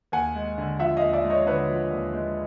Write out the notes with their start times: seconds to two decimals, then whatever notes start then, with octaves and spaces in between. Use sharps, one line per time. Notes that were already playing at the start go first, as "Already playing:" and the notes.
0.12 D#2 F#5 G#5
0.35 G#3
0.58 D3
0.79 F3 E5 F#5
0.97 D#5 F5
1.02 D#2
1.13 D5 E5
1.25 G#3
1.30 C#5 D#5
1.46 D3 B4 C#5
1.69 F3
1.91 D#2
2.13 G#3